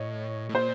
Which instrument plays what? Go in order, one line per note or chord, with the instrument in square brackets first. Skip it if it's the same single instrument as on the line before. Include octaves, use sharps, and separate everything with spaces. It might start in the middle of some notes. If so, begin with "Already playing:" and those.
Already playing: [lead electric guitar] A2 [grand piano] C#5 D#5
[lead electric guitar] A2
[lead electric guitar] A#2 [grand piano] C5